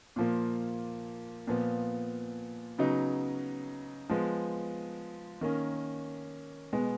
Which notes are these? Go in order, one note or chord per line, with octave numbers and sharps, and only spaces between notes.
A#2 F3 A#3
A#2 F3 B3
C#3 F#3 B3 D#4
F3 G#3 B3
D#3 A#3 C#4
B2 G#3 B3